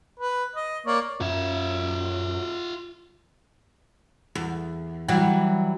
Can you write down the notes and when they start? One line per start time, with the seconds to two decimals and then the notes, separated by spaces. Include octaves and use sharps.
0.19 B4
0.56 D#5
0.87 A#3 C#5 D5
1.20 F#2 F4 E5
4.35 E2
5.08 E3 F#3 G3